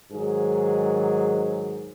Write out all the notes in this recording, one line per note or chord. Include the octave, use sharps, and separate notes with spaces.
G#2 D#3 F#3 G#4